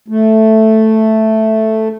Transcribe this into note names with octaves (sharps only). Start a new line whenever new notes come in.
A3